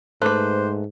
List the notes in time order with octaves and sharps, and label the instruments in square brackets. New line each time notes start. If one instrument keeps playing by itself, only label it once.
[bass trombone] G#2 [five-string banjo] A3 B4 [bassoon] C5 [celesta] D6 F#6